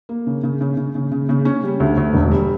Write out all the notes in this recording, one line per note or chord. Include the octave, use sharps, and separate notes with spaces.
A#3
C#3
C#3
C#3
C#3
C#3
C#3
C#3
C#4
G3
D2
D2
E1
G3